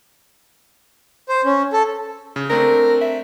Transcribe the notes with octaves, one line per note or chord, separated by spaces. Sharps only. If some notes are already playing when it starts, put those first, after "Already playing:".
C5
C#4
A4
C#3
A3 C4 D4 A#4
E5